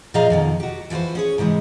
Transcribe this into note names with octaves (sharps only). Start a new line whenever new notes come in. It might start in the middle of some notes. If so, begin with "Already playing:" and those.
A#2 F3 G#4 D#5 F5 A#5
F2 B2 D#3
F#4 G4
E3 F3 F#4 B4 C5
C#4 G#4 C#5
G#2 C3 E3 G#3